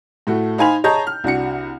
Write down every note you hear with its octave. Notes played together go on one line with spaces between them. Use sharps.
A2 A3 F#4
D#4 C5 F5 G#5 B5 F7
G#4 C#5 D#5 A5 A#5 G6
F6
C2 D4 F#4 C#7